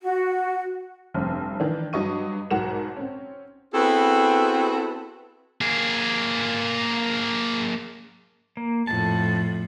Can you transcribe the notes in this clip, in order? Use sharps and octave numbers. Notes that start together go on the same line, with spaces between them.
F#4
F1 G2 C4
D#3 E3 D4
G2 F#3 D#5 C#6 D#7
B1 G#2 F#4 A#4 F#5 E7
C4 C#4
B3 C4 E4 F#4 G#4 A4
A#3 G#4
A#3
F2 A2 A5